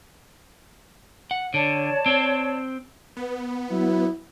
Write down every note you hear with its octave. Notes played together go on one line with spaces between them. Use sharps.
F#5
D3 C#5 D5 A5
C4
B3
F#3 E4